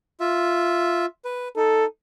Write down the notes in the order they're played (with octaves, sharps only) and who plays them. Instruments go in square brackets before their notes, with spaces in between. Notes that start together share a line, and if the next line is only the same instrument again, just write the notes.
[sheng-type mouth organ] F4 E5
B4
[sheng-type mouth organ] D#4 [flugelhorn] A4